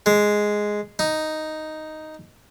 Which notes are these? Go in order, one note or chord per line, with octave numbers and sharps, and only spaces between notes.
G#3
D#4